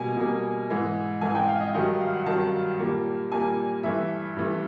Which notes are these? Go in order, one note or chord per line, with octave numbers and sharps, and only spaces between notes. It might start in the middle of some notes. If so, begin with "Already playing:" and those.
Already playing: B2 G3 A#3 G#5
B2 G3 A#3
G#2 E3 G#3
G#2 E3 G#3 G#5
G5
F5
D#5
G2 D#3 F#3 D#5
F5
F#5
G2 D#3 F#3 A5
A#2 G3 A#3
A#2 G3 A#3 G#5
G2 E3 A3 E5
G2 E3 A3